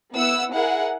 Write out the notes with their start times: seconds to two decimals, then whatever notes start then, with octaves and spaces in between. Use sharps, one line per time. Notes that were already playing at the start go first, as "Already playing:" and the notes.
0.13 B3 E4 F#5 E6
0.53 E4 G#4 A#4 F#5